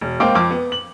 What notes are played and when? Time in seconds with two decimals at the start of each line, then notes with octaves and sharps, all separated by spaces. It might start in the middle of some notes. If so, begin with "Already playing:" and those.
0.01 E1
0.20 G#3 A#3 C4 G5 D6
0.35 F2 D6
0.51 B3
0.72 F#7